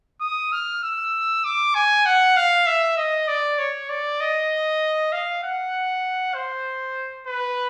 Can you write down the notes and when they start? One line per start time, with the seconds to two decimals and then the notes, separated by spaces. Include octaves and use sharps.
0.21 D#6
0.52 F6
0.83 E6
1.44 D6
1.75 G#5
2.06 F#5
2.36 F5
2.67 E5
2.97 D#5
3.28 D5
3.59 C#5
3.89 D5
4.21 D#5
5.13 F5
5.44 F#5
6.35 C5
7.27 B4